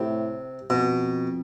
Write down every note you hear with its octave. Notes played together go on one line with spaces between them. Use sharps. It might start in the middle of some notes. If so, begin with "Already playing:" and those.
Already playing: A2 C3
F2 B2